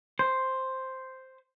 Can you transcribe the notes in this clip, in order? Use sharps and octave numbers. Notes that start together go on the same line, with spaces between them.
C5